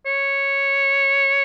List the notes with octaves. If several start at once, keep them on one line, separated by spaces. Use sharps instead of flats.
C#5